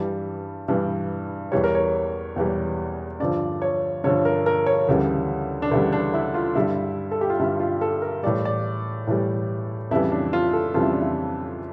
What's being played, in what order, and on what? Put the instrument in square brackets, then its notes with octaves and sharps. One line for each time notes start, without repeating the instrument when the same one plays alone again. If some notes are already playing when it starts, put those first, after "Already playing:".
Already playing: [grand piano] G2 E3 G3
G2 E3 G3
E2 E3 G3 C#5
A#4
C#5
E2 E3 G3
G2 D3 F3 D5
C#5
G2 D3 F3 C#5
A#4
A#4
C#5
D2 C#3 E3 G3
D4
D2 C#3 E3 G3 E4
D4
E4
F4
G2 D3 G3 E4
A4
G4
F4
G2 D3 G3 E4
F4
A4
A#4
A2 E3 G3 D5
D5
A2 E3 G3
F2 C#3 E3 G3 E4
D4
F4
A4
F2 C#3 E3 G3 F4
E4
D4
E4